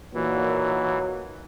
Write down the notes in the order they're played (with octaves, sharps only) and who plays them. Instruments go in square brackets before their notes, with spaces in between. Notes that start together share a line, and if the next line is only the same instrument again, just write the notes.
[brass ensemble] A#2 [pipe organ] E3 [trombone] F#3 [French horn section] A#3 D#4 F#4